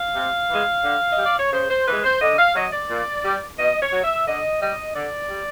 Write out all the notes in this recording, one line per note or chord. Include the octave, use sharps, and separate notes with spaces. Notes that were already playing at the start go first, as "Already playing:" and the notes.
Already playing: F5
C3
E3 G#3
D3
D#5
G3
D5
C#5
C#3 C5
C5
E3 G#3 B4
C5
D3 D#5
F5
F#3 D#5
D5
A#2
G3
B2 D#5
C#5
F#3
E5
D3 D#5
G3 D#5
D3 D5
G3